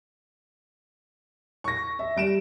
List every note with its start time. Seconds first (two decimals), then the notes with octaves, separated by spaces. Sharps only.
1.64 C#6 A#6
1.99 E5
2.16 G3 D7 E7